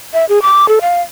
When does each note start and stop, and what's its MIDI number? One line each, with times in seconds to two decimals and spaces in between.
0.14 0.25 76
0.29 0.42 68
0.42 0.68 86
0.68 0.79 69
0.81 1.01 77